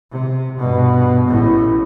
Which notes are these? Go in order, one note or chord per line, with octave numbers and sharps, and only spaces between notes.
C3
G2 B2
A1 A2